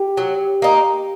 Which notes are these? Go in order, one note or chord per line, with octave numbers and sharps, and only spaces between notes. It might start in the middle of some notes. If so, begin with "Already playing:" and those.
Already playing: G4 G5
F#3
A#3 D#4